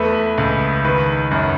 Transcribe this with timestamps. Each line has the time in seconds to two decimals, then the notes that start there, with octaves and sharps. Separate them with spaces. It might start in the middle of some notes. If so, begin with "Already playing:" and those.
Already playing: E2 A3 B4
0.38 C#2
0.85 D#3 B4
1.31 F#2